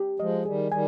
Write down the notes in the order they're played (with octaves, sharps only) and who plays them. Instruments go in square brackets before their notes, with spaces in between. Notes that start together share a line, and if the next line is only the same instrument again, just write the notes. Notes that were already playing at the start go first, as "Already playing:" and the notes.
Already playing: [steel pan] G4
[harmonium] F3 G#3 [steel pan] D#5
[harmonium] D#3 G3 [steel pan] G#4
[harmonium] D#3 G3 [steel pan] G#5